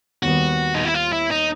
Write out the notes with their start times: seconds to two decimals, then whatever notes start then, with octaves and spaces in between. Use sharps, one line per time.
0.23 D#2 D#3 G3 B3 F#4
0.75 D#4
0.85 E4
0.94 F4
1.12 E4
1.31 D#4